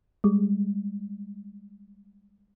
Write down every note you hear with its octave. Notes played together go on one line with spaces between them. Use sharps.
G3 G#3